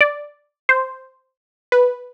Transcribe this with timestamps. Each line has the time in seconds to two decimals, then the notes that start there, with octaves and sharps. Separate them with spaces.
0.01 D5
0.69 C5
1.72 B4